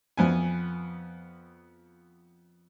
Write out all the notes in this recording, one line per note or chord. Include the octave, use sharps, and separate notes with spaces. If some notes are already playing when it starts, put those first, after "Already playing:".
F2 B3 G#5